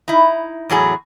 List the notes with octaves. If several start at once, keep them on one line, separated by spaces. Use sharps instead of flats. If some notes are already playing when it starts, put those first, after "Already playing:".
D#4 E4
E2 A2 F#3 G#4